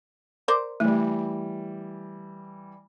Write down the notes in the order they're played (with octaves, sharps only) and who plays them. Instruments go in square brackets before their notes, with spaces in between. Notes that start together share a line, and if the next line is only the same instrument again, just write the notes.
[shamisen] A#4 C5 D5
[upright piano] E3 G3 [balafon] A3